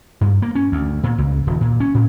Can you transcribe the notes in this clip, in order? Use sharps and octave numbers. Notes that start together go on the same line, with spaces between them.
G2
A#3
C#4
D2
A#2
C#2
D#1
A#2
C#4
A2